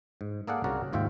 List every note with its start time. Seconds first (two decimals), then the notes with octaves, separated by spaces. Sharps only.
0.21 G#2
0.47 A#3 G#4 A4 D5 F5 F#5
0.64 C2 C#3 F#4 A#4 D5
0.93 D#2 G#2 F4 E5 G5